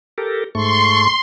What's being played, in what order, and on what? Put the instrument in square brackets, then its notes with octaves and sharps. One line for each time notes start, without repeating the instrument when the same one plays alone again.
[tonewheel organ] G4 A4 A#4
[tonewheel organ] G#2 A3 C#6 [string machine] C6